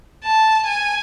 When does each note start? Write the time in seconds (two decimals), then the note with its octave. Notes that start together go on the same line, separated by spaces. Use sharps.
0.24 A5
0.67 G#5